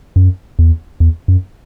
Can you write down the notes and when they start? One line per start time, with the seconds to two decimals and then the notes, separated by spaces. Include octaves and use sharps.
0.16 F#2
0.59 E2
1.00 E2
1.28 F#2